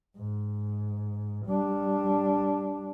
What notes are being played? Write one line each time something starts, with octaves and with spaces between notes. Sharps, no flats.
G#2
G3 D4